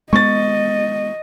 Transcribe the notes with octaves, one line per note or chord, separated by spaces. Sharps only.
G#3 B3 D#5 C#6 A6